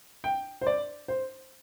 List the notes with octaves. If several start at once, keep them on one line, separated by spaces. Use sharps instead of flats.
G5
C5
D5
C5